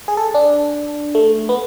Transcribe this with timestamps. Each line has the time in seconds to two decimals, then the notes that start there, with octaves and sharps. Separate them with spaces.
0.08 G#4
0.17 A4
0.35 D4
1.15 A3
1.49 B3